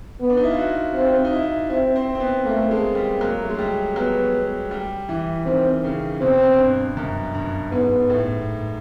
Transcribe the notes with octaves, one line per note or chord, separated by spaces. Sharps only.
B3
D4
D#4
E4
F4
F#4
C4 F4
D#4
E4
C4 E4
C4
C4
B3
A3 A#3
G#3
G3
F#3 A#3
A3
G#3
G3
F#3 B3
G3
E3
D#3 C4
C#3
B2 C4
G2
F#2
G2
G#2 B3
A2